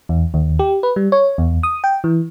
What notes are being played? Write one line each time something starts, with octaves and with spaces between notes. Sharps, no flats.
E2
D#2
G4
B4
G3
C#5
E2
D#6
G5
E3